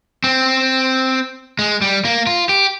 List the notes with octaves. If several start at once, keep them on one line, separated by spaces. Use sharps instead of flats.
C4
G#3
G3
A#3
F4
G4